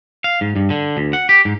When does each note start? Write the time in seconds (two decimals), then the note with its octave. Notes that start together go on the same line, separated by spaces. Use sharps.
0.24 F5
0.41 G#2
0.56 G2
0.70 D3
0.97 D2
1.13 F#5
1.29 G4
1.45 G#2